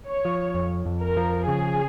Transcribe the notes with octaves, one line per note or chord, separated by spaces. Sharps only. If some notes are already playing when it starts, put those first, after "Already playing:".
C#5
F3
F2
F2
A#4
F3
C#3 G#4